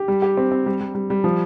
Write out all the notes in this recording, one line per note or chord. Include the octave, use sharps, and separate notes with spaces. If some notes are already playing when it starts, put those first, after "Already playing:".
Already playing: G4
G3
G4
C4
C4
G3
G3
G3
G3
F3